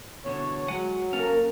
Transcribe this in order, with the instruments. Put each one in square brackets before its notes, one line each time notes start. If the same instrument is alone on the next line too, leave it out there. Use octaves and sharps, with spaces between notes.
[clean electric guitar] E2 B2 D3 [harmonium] C#5
[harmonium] F#3 [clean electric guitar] G#3 G#5 [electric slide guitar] C#5 F#5
[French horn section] A#3 A#4 [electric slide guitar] C#4 [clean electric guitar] A4 F5